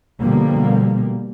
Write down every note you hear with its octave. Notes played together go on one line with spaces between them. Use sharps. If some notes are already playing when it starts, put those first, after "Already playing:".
B2 D3 F3 G3 A#3